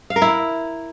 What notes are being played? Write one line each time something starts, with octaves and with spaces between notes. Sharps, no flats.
F5
A#4
E4